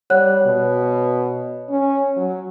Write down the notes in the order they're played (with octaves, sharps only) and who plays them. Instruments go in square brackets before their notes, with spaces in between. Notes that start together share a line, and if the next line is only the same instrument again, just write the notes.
[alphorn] G3 [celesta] C#5 F#5 F#6
[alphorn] B2
C#4
F#3